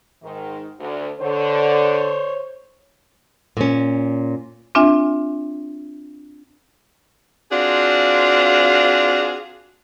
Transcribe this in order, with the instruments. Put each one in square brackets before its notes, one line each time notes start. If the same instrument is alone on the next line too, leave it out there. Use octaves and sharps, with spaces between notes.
[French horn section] G#2 D#3
D2
[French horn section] D3 [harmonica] C5 C#5
[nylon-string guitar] A#2 C#4
[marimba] C4 D4 F4 E5 G#5
[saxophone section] C4 D4 F4 F#4 G#4